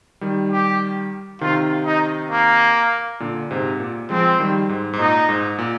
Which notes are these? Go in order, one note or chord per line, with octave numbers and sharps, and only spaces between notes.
D#3 G3
G4
C3 D#3 F4
D#4
A#3
A#2 D3
G#2 C3
A#2
F3 G#3 C4
D#3 G3
G#2
G#2
A#2 D#4
G#2
A#2